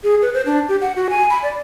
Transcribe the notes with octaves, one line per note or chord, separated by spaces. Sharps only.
G#4
B4
C5
D4
G4
F#5
F#4
G#5
B5
D5